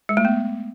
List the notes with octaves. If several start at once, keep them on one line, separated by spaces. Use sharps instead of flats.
G#3
A3
B3